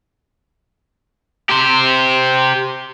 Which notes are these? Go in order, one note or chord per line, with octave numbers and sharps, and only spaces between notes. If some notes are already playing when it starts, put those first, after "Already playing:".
G4 C5